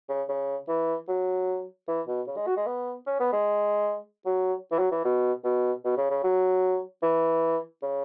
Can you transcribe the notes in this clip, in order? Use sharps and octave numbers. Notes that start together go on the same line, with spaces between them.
C#3
C#3
E3
F#3
E3
B2
C#3
G#3
F#4
G#3
B3
C#4
B3
G#3
F#3
E3
F#3
E3
B2
B2
B2
C#3
C#3
F#3
E3
C#3